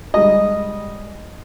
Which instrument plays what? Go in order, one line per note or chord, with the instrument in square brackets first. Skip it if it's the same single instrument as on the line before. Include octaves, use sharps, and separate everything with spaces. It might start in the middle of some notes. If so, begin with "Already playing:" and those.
[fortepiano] G3 G#3 D#5